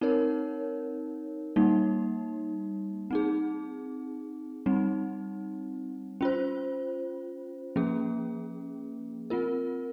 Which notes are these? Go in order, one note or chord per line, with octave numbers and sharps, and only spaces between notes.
C4 D#4 A#4 C#5
G3 A#3 D#4
C4 D#4 G#4
G3 C4 D#4
C#4 F4 C5
F3 A#3 C#4 G#4
C4 F4 A#4